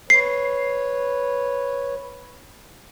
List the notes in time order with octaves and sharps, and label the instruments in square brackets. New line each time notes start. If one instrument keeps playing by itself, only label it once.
[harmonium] B4 C#5 [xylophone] C7